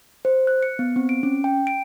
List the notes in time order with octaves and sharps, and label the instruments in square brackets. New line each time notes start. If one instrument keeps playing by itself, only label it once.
[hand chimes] C5
F#6
C#7
B3
C4
D7
C#4
G5
D7